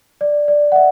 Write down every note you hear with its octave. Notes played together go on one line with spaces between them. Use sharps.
D5
D5
F#5
E5